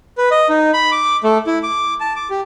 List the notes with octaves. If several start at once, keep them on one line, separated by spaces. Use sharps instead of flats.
B4
D#5
D#4
B5
D6
A3
E4
D6
A5
D6
G4